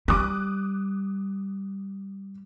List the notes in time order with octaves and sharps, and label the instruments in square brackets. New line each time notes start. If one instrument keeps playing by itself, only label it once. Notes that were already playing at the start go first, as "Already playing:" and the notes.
[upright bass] G3 [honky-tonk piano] D6 D#6 F#6